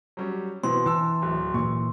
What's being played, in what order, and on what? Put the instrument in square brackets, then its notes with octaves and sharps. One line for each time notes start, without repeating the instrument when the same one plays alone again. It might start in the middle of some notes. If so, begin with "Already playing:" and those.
[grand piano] F#3 G3 C#4
[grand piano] B2 E3 [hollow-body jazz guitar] C4 [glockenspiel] C6
[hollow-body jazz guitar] E3 [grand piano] A5 E6
[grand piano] D1
[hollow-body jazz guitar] A#2 E3 [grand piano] C#6